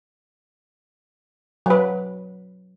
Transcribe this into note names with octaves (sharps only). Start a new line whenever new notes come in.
F#3 B4